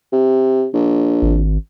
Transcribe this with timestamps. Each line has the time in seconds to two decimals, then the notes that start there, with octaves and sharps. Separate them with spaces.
0.12 C3
0.73 A#1
1.22 G#1